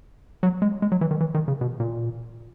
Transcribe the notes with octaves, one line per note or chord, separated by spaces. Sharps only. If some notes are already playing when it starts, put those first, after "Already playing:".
F#3
G#3
G#3
F#3
E3
D#3
E3
D#3
C#3
B2
A#2